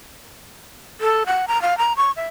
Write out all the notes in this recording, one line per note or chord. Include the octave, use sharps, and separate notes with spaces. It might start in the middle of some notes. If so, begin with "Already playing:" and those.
A4
F#5
A#5
F5
A#5
C#6
E5